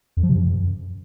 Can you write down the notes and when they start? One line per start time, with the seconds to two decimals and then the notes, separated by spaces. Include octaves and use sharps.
0.17 F2
0.23 F3
0.29 C3
0.35 F#2